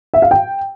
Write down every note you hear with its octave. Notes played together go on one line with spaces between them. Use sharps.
E5
F5
G5